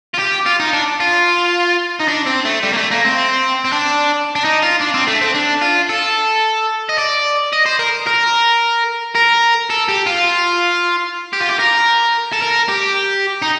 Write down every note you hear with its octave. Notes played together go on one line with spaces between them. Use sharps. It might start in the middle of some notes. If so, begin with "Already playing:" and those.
F4
G4
F4
D#4
D4
F4
D#4
D4
C4
A3
G3
A#3
A3
A#3
C4
C4
D4
D4
D#4
F4
D4
C4
A3
C4
D4
F4
A4
D#5
D5
D#5
C5
A#4
A#4
A#4
A4
G4
F4
G4
F4
G4
A#4
A4
A#4
G4
D#4